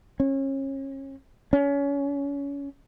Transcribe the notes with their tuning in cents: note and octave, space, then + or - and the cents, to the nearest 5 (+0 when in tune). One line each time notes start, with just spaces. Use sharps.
C#4 -30
C#4 +25